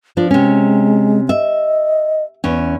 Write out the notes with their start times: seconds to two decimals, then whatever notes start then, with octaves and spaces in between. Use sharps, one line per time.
0.17 F3 D4 F4
0.31 C3 G#3 C#4
1.29 D#5 E5
2.44 E2 C#4